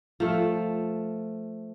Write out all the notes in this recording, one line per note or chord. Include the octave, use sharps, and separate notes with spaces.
F3 A3